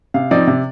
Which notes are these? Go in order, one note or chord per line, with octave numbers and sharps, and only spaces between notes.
C3 F5
F3 C4 D#4 D5
C3